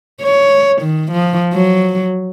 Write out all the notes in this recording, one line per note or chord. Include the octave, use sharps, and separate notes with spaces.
C#5
D#3
F3
F#3